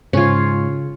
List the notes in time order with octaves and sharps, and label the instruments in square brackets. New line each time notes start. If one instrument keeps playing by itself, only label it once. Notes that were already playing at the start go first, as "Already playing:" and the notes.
[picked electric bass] G#2 [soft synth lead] C#3 [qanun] C#4 F4